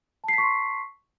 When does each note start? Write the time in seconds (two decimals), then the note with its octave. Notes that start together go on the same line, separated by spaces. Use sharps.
0.24 A5
0.28 C7
0.33 B6
0.38 C#6
0.43 C6